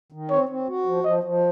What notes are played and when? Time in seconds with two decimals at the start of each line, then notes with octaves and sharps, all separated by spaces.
0.12 D#3
0.30 C4 C#5
0.49 C4
0.67 F#4
0.86 F3
1.04 F3 D#5
1.23 F3